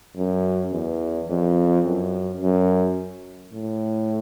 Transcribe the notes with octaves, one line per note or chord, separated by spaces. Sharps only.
F#2
E2
F2
F#2
F#2
A2